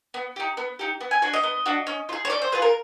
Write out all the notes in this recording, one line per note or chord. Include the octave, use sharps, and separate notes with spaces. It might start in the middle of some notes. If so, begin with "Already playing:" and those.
B3
D#4 G4
B3
D#4 G4
B3
G#5
D4 F#4 G#5
D#5
B3
D4 F#4
C#4
F4
G#4
C#5
C#4 D5
C5
F4 G#4 B4
A#4